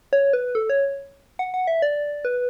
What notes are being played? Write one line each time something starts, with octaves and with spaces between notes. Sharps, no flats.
C#5
B4
A4
C#5
F#5
F#5
E5
D5
B4